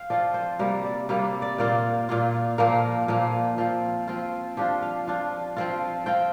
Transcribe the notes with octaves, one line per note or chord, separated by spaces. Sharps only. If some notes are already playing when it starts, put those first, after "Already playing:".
Already playing: C5 F5 G5
F3 C4 F4 D5
C5
C3 G3 A#3 A#4
D5
C3 G3 A#3 D5
D5
A#2 A#3 F4 D5
A#2 A#3 F4
A#2 F3 A#3 A#4
A#2 F3 A#3
F3 C4 F4
F3 C4 F4
F3 D4 F4 G4
F5
F3 D4 F4
F3 C4 F4
F3 C4 F4 G5